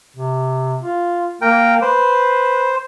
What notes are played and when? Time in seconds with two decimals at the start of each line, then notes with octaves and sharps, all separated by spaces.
0.16 C3
0.81 F4
1.41 A#3 A#4 G5
1.82 B4 C5